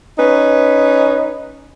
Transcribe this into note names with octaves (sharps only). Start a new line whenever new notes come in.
C#4 D#4 B4